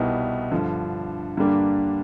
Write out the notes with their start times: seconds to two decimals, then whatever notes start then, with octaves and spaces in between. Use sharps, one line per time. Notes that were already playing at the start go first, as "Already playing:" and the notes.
Already playing: C2 B2 G3 B3 D#4
0.51 G2 D3 F3
1.37 G2 D3 G3 A#3 D4